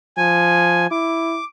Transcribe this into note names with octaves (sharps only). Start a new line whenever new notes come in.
F3 G#5
E4 D6